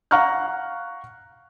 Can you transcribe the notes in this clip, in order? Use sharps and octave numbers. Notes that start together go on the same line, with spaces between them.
F5 F#5 A#5 C#6 F6 F#6